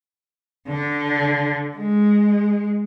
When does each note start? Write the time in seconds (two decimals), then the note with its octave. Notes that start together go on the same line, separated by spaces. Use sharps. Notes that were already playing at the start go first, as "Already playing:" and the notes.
0.68 D3
1.76 G#3